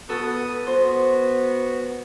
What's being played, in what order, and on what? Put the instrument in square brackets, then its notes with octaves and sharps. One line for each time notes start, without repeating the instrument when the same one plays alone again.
[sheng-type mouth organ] B3 D#6 [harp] F#4 A4
[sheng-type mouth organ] B3 F#4 [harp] C5